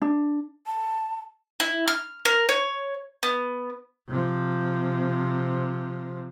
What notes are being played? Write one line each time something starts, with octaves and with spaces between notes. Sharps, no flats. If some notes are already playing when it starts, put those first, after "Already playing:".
D4
A5
E4
F6
A#4
C#5
B3
C3 F3